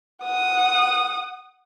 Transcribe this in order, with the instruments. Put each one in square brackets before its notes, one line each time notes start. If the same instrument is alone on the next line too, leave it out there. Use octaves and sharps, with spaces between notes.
[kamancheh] F#5 D#6